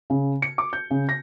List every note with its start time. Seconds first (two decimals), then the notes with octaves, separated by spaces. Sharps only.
0.10 C#3
0.42 C#7
0.58 D6
0.73 G6
0.91 C#3
1.09 A#6